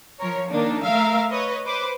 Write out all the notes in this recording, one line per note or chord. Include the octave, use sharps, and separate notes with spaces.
F3 A#4 C#5
D#3 A#3 D4 D#4
A3 A#4 E5 F5
B4 C#5 D#5
B4 C5 D6